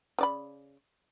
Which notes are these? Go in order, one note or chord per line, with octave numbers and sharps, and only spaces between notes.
C#3 D5 B5